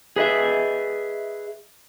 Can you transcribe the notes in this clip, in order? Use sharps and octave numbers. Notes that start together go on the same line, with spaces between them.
G#4 B4 D#5 E5